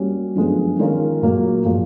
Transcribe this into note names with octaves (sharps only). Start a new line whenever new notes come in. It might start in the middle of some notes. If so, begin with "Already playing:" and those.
Already playing: G3 A#3 C#4 F#4
F#2 D3 F3 G#3 B3
D#3 G#3 C#4 F4 A#4
A#2 F#3 A#3
A#2 F3 G#3